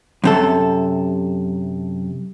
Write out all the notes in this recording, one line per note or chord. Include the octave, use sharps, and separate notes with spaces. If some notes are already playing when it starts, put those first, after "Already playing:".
F#2 C3 A4